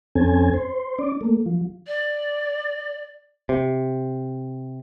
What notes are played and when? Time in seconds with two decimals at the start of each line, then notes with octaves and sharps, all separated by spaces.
0.15 F2 C4 C#4 A4 G#5
0.54 C5
0.98 C#4 D5
1.21 A3 A#3
1.46 F3
1.87 D5
3.49 C3